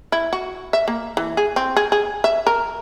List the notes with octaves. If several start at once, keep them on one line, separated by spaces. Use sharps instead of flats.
E4
F#4
E5
A#3
E3
G#4
C4
G#4
G#4
E5
A#4